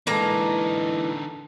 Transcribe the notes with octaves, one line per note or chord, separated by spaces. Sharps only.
D3 E3 G#3 A#3 D#4 A4 A5 A#5